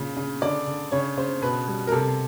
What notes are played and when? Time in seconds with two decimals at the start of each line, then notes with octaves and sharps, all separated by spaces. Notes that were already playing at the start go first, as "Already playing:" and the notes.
Already playing: A#2 C#3
0.17 C#3
0.42 D3 D5
0.67 D3
0.92 C#3 C#5
1.17 C#3 C5
1.42 B2 B4
1.68 G3
1.87 A#4
1.92 C3 A4